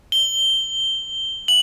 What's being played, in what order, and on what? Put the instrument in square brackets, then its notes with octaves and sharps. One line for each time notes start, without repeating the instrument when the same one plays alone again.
[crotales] G7
F#7